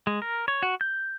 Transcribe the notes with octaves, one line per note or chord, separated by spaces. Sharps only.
G#3
A#4
C#5
F#4
G6